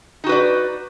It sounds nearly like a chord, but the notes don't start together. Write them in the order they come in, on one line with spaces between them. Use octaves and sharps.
D#4 F#4 B4 D5